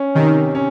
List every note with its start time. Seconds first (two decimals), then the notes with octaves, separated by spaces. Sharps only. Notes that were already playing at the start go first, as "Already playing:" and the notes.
Already playing: C#4
0.15 C3 D#3
0.55 C#4